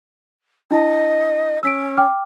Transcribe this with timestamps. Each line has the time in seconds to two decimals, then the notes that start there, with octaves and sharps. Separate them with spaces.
0.71 D4 E4 D#5 A5
1.63 C#4 E6 B6 D7
1.97 G5 D6 F6